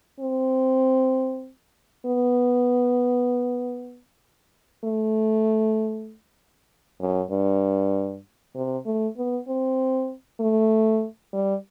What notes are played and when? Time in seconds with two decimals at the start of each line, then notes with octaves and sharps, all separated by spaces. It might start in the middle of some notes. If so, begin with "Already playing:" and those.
0.20 C4
2.06 B3
4.84 A3
7.00 F#2
7.31 G2
8.56 C3
8.86 A3
9.17 B3
9.48 C4
10.40 A3
11.33 G3